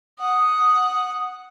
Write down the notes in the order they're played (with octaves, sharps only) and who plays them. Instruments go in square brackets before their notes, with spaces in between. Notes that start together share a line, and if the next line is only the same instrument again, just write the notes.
[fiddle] F#5 [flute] D#6